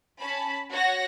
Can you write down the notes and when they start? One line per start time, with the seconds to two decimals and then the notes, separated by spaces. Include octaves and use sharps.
0.19 C#4 A5 B5
0.71 F#4 C#5 F#5 A#6